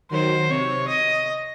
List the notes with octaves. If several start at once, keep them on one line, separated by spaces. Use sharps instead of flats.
D#3 F#3 C5
C3 C#5
D#5